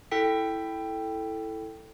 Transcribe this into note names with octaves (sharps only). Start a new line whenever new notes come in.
E4 A4 G5 B6